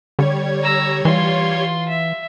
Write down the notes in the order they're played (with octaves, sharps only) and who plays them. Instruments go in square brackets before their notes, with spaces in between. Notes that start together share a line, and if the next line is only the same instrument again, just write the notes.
[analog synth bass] D3 [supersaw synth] G3 C#5 G#6
[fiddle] A#5 E6
[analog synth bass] E3 [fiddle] F4 C6
[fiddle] E5